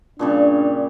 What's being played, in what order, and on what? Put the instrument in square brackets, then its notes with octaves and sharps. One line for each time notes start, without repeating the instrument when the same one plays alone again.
[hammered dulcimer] A#2 C#3 G3 [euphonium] D4